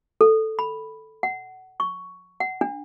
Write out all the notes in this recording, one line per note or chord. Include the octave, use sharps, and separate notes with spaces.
A4
B5
F#5
C#6
F#5
D4